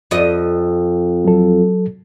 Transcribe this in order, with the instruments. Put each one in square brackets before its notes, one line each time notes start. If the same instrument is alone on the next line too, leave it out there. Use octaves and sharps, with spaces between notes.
[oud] F2 D#5
[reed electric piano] F#3 A4